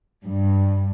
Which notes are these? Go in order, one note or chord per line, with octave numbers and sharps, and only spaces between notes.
G2